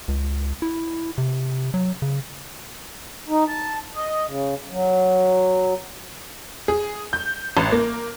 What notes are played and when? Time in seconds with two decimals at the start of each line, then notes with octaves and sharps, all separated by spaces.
0.08 C#2
0.62 E4
1.18 C3
1.74 F#3
2.02 C#3
3.29 D#4
3.47 A5
3.95 D#5
4.26 C#3
4.70 F#3
6.68 G#4
7.13 G6
7.57 A1
7.72 A#3